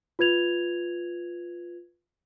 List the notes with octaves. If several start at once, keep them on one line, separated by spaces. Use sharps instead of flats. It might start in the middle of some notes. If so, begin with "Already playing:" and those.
F4 B4 G#6 F7